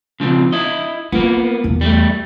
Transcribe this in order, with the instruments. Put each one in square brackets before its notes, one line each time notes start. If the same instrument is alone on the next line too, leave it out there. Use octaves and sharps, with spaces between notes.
[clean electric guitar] C#3 F3 C4
E4 D#5
[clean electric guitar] A#3 B3 [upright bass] F4
[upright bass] E2 E3
[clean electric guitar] G3 A3